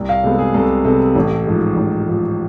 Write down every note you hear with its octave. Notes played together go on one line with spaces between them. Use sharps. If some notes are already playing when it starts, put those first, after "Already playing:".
Already playing: C2
F5
C3 G#3 B3 A4
G#4
C2 A4
C3 G#3 B3 A4
A1
G#2 F3
A1
G#2 F3